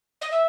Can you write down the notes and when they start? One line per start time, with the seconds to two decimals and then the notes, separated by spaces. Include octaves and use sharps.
0.21 D#5
0.31 E5